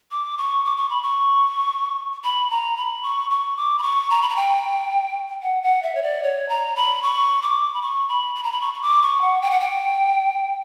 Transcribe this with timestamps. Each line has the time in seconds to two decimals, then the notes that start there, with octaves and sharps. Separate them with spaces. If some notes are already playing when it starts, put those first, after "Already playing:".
0.11 D6
0.38 C#6
0.64 D6
0.77 C#6
0.90 B5
1.03 C#6
2.24 B5
2.50 A#5
2.77 B5
3.03 C#6
3.30 C#6
3.57 D6
3.79 B5
3.83 C#6
4.10 A#5
4.22 B5
4.29 A#5
4.36 G5
5.43 F#5
5.63 F#5
5.83 E5
5.95 C#5
6.03 D5
6.23 C#5
6.49 A#5
6.76 B5
7.02 C#6
7.42 D6
7.74 B5
7.82 C#6
8.09 B5
8.35 B5
8.43 A#5
8.52 B5
8.61 C#6
8.74 C#6
8.82 D6
9.02 C#6
9.22 F#5
9.42 G5
9.51 F#5
9.60 G5